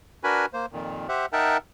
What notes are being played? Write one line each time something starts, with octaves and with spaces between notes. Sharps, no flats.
D4 F#4 A#4 B4 G#5 B5
A#3 C5
F2 A#2 D#3
G4 C5 E5 F#5
D#4 A#4 E5 F#5 G5 A5